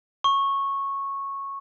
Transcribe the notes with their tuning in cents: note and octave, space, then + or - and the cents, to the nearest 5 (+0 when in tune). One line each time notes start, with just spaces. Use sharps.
C#6 -10